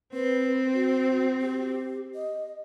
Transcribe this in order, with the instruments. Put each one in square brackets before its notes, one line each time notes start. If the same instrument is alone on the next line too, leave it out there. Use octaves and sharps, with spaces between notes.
[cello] C4 [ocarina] B4
[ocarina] F#4
G4
D#5